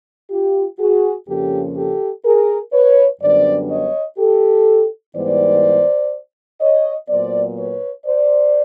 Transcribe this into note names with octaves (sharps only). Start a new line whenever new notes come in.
F4 G4
F#4 G#4
F2 C#3 F3 A#3 C#4 G4 A4
G4 A4
G#4 A#4
B4 C#5
F#2 D3 G3 B3 D4 C5 D5
C#5 D#5
G4 A4
G#2 E3 G3 B3 C5 D5
C#5 D#5
A#2 F#3 B3 C5 D5
B4 C#5
C5 D5